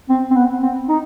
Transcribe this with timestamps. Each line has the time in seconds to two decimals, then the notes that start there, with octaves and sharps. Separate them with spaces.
0.09 C4
0.31 C4
0.36 B3
0.62 C4
0.89 D#4